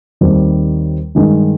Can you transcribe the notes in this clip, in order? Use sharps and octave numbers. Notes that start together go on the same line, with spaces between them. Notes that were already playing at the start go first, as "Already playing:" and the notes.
D#2 D#3 G3 C4
G2 D#3 G#3 D#4